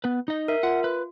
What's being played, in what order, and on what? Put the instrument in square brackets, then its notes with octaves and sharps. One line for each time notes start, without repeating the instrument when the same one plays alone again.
[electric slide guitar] B3 B4
D#4 D#5
[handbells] A#4 E5
[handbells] F4 [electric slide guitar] F#5
[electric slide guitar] B4